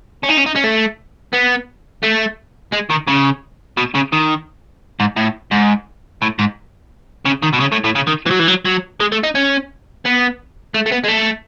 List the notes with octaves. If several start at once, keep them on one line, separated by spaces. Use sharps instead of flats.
C#4
D#4
C#4
D#4
C#4
A3
B3
A3
G#3
D#3
C#3
B2
C#3
D#3
G#2
A2
G#2
A2
G#2
C#3
D#3
B2
C#3
A2
A2
C#3
D#3
E3
F#3
E3
F#3
F#3
G#3
A3
D#4
C#4
B3
A3
A3
B3
G#3
A3